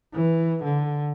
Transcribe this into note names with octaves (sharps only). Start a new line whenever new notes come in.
E3
D3